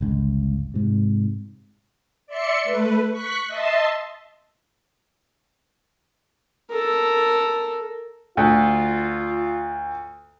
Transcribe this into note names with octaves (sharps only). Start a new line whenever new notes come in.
G1 C#2
G#2 C3
D5 E5 C6 C#7
A3 B4
C#6 F#6 B6
D#5 E5 A5 C6
A4 A#4
D2 F4